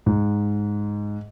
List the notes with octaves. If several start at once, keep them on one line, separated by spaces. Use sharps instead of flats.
G#2